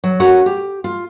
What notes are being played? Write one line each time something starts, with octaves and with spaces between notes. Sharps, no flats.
F#3
C#4 F#4 A#4 F#5
G4
F4